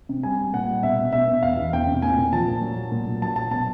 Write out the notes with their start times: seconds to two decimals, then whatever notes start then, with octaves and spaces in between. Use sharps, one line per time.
0.09 C3
0.23 G3 G#5
0.39 G3
0.53 A#2 F#5
0.68 G3
0.83 B2 E5
0.98 B2
1.13 B2 E5
1.27 B2
1.42 E2 F5
1.57 E3
1.73 E2 G5
1.87 C3
2.02 A#2 G#5
2.18 A#2
2.33 F3 A5
2.48 A#2
2.62 F#3
2.76 F#3
2.92 A#2
3.06 A#2
3.22 F#3 A5
3.36 F#3 A5
3.51 B2 A5